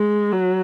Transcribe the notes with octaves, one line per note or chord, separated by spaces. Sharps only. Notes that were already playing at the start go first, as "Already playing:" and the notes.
Already playing: G#3
F#3